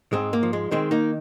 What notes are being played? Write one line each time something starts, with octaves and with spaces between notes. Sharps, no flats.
G#2 G#3 C4
A#3
F3
G#3
D#3 G#3 C4
A#3 D#4